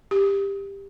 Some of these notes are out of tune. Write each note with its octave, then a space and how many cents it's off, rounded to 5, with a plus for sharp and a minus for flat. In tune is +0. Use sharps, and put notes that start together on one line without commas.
G4 +15